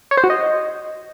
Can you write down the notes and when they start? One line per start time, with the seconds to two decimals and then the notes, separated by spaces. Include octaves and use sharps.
0.11 C#5
0.17 C5
0.24 F#4
0.30 D#5